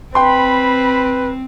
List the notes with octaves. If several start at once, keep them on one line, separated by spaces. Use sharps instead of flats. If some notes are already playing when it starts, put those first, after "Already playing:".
C4 B4 G5 B5 C6